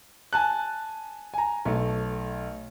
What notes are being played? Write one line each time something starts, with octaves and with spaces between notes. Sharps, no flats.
G#5 A5 F#6
G#5 A#5
B1 A3